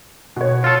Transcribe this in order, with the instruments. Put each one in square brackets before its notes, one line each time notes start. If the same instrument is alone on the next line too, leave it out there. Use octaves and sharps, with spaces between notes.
[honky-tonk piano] B2 C#5
[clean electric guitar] F4 A4